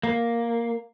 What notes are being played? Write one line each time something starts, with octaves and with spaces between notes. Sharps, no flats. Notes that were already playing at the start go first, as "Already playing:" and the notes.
A#3